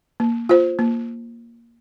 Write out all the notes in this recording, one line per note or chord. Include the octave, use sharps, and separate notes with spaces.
A#3
F4 C5
A#3